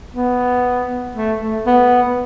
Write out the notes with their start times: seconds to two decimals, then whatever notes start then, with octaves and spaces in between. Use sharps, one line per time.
0.14 B3
1.15 A3
1.40 A3
1.66 B3